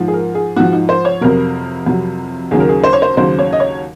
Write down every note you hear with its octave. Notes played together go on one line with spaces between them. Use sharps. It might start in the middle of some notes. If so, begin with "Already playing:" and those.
Already playing: G#2 F3
G#4
A#4
G#4
G#2 F3 F#4
D#4
C5
C#5
F2 C3 F#3 A#4
F2 C3 F#3
D#2 C#3 F#3 G#4
A#4
G#4
C5
C#5
C5
D#2 C#3 F#3 C5
C#5
D#5
C#5